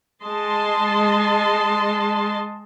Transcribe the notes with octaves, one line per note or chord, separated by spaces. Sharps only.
G#3 D#5 A5 C6